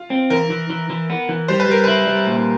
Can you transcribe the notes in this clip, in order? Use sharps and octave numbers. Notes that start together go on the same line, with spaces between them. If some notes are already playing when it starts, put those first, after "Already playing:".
Already playing: F4
C4
E3 A#4
E3
E3
E3
B3
E3
G3 C5
B4
G3 A#4
E4 B4
G3
A#2